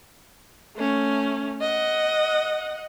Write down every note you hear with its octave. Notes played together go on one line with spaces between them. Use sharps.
A3 C#4
D#5 F#5